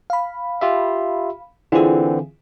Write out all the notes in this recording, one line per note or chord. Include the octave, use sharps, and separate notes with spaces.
F5 B5
F4 G4 E5
D3 E3 C4 E4 F4 G#4